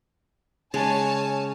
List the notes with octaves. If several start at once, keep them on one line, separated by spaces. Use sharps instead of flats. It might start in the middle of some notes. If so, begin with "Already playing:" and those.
C#3 G#3 C#5 D5 G#5 A5